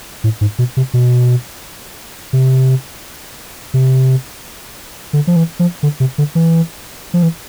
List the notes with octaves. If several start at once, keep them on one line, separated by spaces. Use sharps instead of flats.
A2
G#2
B2
C3
B2
C3
C3
D3
F3
E3
F3
D3
C3
D3
E3
F3
E3